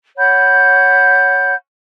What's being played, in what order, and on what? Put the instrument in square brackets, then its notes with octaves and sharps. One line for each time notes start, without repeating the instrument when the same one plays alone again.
[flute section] C#5 F#5 B5 G6